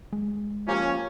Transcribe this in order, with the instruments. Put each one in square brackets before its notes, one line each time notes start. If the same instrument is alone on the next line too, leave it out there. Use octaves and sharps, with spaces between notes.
[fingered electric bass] G#3
[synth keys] F3 A#3 G4 [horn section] C#4